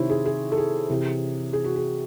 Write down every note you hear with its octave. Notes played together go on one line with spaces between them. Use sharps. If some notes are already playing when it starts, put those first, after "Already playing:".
Already playing: C3 D#3 E4 C5 C#5
G#4
G#4
A4
G#4
C3 E3
G#4
F#4
G#4